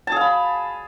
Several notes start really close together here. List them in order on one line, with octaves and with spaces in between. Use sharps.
A5 G#4 F5 B5